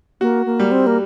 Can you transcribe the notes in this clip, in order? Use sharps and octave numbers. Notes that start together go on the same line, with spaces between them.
A#3 F#4
A#3
G3
C4
A#3